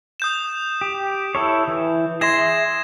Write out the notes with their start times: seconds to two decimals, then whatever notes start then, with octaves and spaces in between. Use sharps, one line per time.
0.20 D#6 G6 E7
0.81 G4
1.35 E4 A4 C#5
1.68 E3
2.21 G#4 E5 C6 G#6 A#6 E7